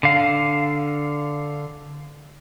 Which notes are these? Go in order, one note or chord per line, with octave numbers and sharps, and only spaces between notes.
D3 F5